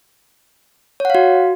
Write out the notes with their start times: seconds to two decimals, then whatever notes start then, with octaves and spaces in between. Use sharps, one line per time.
1.00 C#5
1.05 F#5
1.10 F5
1.15 F#4